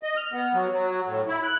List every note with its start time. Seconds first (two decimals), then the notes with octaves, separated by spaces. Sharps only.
0.03 D#5
0.17 F6
0.32 B3
0.53 F#3
0.72 F#3
1.06 A2
1.28 E4
1.43 F#6